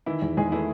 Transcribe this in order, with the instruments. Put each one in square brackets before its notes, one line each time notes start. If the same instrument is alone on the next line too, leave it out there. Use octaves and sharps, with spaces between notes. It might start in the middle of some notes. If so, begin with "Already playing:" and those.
[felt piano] D#3 [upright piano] E3 E4
[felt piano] E2
[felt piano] E2 [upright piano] G#3 G#4
[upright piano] E3 E4 [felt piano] A3